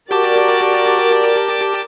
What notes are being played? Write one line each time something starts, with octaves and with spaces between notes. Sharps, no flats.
F#4 G4 A#4 D5 A5 D6